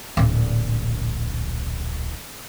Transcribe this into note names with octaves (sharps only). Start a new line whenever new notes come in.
D1 A#1